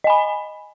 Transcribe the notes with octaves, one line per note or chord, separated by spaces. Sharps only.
D#5 G#5 B5